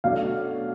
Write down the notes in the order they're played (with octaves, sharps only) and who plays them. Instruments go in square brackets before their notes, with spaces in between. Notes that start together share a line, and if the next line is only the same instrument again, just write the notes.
[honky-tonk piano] B2 F#3 A3 D4 [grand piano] F5